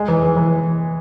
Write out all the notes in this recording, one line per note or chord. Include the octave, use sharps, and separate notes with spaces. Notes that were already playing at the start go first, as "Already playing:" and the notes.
Already playing: G#3
E3
E3
E3